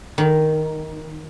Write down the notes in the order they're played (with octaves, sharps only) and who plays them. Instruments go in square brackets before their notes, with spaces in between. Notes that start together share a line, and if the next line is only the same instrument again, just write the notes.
[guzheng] D#3